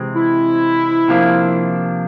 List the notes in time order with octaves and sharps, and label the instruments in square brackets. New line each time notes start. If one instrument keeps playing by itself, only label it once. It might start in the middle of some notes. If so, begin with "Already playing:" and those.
Already playing: [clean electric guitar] C3 E3 G#3 C4
[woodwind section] E4
[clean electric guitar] C3 F3 A#3 D4